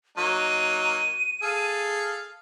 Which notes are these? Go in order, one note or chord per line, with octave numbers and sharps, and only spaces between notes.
F#3 A#3 D#4 D#7
G#4 A4 F5